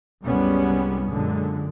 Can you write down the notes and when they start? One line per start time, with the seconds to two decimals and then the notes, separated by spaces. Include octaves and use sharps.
0.25 C2 F#2 G3 G#3 B3 C#4
1.11 F#2 A#2 D3 G#3